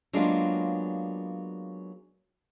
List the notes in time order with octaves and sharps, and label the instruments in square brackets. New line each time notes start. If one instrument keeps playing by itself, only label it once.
[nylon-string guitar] F#3 G#3 A#3 B3 D4 F4